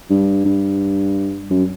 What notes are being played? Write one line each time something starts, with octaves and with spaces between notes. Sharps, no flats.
G2
G2
F#2